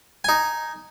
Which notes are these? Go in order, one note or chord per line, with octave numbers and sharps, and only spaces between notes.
D#4 G#5